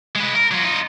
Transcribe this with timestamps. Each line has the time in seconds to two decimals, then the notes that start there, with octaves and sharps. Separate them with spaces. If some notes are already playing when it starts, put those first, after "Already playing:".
0.15 G#3 B4
0.35 A#4
0.51 F#3 F4
0.64 D#4 F4